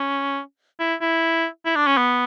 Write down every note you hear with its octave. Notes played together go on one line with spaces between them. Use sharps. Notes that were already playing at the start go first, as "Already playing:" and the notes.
Already playing: C#4
E4
E4
E4
D4
C#4
B3